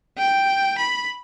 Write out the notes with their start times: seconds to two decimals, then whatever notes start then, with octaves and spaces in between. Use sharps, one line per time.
0.18 G5
0.78 B5